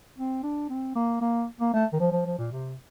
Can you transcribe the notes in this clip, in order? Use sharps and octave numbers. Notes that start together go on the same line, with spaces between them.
C4
D4
C4
A#3
A#3
A#3
A3
D#3
F3
F3
F3
A#2
C3